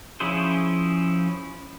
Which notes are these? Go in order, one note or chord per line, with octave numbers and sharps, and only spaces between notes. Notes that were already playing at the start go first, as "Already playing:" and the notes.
F3 C#4 E4 G#4 C5